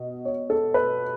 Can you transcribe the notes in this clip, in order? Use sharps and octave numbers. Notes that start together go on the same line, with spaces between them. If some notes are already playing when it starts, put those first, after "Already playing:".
Already playing: B2 D#5
C#5
A4
B4